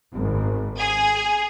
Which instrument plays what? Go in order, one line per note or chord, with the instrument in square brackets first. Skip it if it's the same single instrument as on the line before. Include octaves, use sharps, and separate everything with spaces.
[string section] G#1
G#4